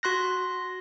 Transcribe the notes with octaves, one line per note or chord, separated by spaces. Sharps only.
F#4 C6 F#6 A#6